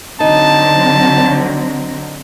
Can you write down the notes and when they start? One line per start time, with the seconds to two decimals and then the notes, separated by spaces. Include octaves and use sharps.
0.20 D3 F#3 C4 D#4 A5